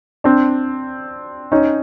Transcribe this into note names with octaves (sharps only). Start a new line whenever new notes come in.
C4 D4
C#4 D#4